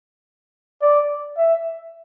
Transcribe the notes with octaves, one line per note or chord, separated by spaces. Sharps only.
D5
E5